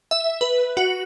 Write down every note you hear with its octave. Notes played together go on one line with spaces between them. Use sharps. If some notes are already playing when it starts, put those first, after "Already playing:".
E5
B4
F#4